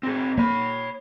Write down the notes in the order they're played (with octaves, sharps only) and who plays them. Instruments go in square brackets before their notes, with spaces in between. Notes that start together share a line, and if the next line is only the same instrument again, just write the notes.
[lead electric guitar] C4 G#4
[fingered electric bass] A#3 [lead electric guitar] C#5 B5